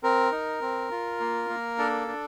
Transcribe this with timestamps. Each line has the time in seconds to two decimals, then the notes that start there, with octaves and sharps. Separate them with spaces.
0.03 C4 A#4
0.32 D#4
0.61 C4
0.91 F4
1.20 A#3
1.50 A#3
1.78 D4 A4
2.08 D4